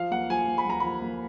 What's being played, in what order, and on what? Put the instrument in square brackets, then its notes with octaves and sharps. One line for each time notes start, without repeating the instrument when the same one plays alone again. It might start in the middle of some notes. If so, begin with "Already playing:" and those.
Already playing: [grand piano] F3 F5
A#3 F#5
F3 G#5
A#3
B5
A#3 A#5
F3 B5
A#3